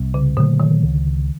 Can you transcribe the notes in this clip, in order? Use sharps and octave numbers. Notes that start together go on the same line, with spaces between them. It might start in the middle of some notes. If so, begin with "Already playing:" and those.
Already playing: C2
C#3
A#2 D3 F#3 A3
D#3
C#2